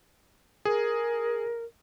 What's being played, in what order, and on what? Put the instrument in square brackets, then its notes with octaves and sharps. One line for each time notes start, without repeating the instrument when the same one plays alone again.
[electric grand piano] G#4 [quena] A#4